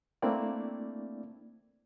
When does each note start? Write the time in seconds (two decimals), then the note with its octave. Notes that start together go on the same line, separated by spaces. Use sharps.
0.22 A3 A#3 C4 D4 E4 D5